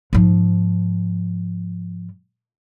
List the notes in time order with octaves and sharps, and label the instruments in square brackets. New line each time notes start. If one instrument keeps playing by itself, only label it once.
[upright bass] G#2 F3